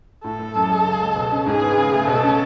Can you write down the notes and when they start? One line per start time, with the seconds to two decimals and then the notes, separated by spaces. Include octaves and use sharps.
0.24 A2 A4
0.39 A3
0.55 F#2
0.70 G#3
0.85 C#2
1.01 G#3
1.16 B2
1.31 C#4
1.46 G#2 G#4
1.61 B3
1.77 C#3
1.92 A3
2.07 B2 A4
2.23 C#4